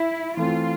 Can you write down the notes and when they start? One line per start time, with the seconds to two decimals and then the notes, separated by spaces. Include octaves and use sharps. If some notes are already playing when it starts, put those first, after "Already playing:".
Already playing: E4
0.37 E3 A3 C4 F4